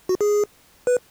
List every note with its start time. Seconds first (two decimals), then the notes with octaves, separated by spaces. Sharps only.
0.09 F#4
0.21 G#4
0.87 B4